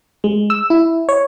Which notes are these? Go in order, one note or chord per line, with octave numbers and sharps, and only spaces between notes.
G#3
E6
E4
C#5